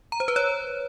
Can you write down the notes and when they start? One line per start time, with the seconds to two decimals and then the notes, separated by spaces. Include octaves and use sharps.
0.12 A#5
0.20 C5
0.28 B4
0.36 C#5